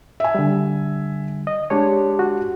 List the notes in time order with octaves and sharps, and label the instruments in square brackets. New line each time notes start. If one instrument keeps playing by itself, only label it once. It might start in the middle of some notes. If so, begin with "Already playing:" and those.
[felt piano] E5 G#5
[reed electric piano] D3 G3
D#5
[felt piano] G#3 D4 G4 [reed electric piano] C#5
[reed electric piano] F#4